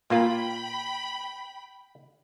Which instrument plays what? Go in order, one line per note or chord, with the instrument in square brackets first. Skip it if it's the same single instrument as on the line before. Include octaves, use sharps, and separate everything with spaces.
[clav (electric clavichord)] A#2 A#3 F4 [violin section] G5 B5